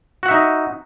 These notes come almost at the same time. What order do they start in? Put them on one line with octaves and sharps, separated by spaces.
F#4 F#5 E5 D#4